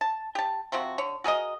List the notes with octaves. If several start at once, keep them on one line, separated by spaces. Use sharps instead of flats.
A5
G4 A5
C3 F3 C4 F#4
D3 C#5
F#4 G#4 A#4 D#5